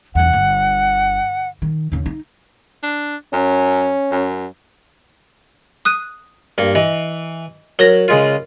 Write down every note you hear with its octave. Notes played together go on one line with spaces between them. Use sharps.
F1 E2 F#5
G1
D#3
D#2 C#3
D#4
D4
F#2 C#4
F#2
D#6 F#6 D#7
G2 A#3
E3 D#5
F#3 A#4 C#5 A#6
C#3 G#3 F4